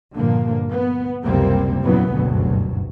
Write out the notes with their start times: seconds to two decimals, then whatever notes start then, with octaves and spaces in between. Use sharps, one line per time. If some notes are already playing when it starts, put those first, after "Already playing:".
0.16 G2 A#2 D3 F3 A#3
0.71 B3
1.23 F#1 C#2 C3 G3 A#3 C4
1.85 E2 A#2 C#3 E3 F#3 B3
2.14 F#1 D2 G2 B2 F#3